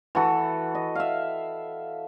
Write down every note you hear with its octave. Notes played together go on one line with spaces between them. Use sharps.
E3 F#4 A4
D#5
E5 F5